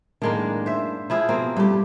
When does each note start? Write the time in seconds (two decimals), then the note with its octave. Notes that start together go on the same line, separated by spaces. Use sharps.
0.22 F#2 A2 D#3 G#3 A#3 D4
0.66 C5 E5
1.10 F3 E4 G#4
1.29 B2 A#3 C4
1.57 G2 G3 A3 C#4 G4